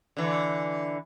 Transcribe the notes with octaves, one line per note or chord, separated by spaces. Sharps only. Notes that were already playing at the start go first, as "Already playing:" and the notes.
D3 E3